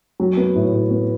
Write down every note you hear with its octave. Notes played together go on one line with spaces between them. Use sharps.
F#3
B3
A2
A2
B3